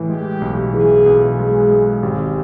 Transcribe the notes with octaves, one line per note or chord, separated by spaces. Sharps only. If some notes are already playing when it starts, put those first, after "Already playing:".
Already playing: A2 E3
G#3 G4
B1
E3 G#4
B1
G#3 G#4
G#3
G#1 G4